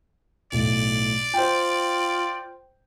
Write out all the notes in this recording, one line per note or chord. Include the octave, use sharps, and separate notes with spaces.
B1 A2 D5
F4 C5 G5